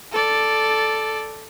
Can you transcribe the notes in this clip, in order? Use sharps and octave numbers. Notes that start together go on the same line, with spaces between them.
A4 D5